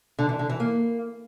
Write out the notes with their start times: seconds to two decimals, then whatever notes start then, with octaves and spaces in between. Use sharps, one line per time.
0.19 D3
0.29 E3
0.39 D3
0.50 E3
0.60 A#3